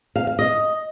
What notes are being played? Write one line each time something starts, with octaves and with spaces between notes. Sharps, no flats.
F5
F5
D#5